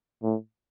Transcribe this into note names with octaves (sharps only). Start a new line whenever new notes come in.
A2